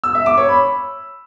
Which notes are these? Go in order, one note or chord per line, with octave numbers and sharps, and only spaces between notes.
E6
E5
D6
C#5
B5